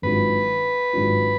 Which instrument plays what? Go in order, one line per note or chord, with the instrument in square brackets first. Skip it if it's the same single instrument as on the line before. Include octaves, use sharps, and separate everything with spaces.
[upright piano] G#1 G#2 F#3 D4 F4 [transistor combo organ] B4
[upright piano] G#1 G#2 F#3 D4 F4